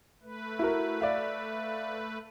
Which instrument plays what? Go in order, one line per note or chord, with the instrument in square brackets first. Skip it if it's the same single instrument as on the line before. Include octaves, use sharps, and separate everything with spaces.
[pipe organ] A3 B4
[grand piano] E4 F#4 A#4
D5 E5 F5